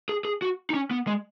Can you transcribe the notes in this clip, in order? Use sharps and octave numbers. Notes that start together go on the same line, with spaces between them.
G#4
G#4
F#4
D#4
C#4
B3
G#3